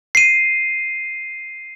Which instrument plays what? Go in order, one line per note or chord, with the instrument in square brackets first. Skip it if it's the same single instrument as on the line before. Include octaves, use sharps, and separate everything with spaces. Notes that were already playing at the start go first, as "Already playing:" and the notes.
[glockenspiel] C7 D#7